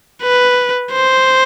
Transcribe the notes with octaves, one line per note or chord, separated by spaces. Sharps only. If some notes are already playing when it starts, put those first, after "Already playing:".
B4
C5